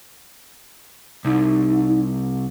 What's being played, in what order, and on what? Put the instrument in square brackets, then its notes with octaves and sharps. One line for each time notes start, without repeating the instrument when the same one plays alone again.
[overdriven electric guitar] C2 [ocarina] D#4